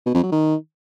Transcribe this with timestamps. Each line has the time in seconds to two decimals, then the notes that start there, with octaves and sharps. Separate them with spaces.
0.06 B2
0.15 F2
0.23 F#3
0.32 D#3